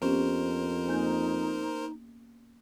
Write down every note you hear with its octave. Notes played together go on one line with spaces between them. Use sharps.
F2 B3 C#4 G4 A#4 C5
A#3 D#4 G#5 G6